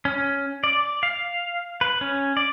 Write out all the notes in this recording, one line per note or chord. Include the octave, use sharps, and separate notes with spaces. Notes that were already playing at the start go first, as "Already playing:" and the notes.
C#4
D5
F5
B4
C#4
D5